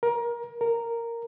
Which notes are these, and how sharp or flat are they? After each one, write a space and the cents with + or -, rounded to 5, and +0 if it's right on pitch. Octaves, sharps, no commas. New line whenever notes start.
A#4 +25
A#4 -5